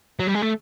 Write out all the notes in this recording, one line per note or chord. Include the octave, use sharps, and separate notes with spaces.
F#3
G3
G#3
A3